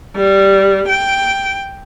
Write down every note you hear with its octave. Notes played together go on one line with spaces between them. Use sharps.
G3
G5